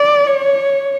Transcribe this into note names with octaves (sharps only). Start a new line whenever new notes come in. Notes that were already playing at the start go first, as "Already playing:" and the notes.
Already playing: D5
C#5